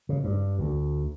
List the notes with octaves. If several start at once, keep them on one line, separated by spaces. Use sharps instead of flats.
C#3
G2
D2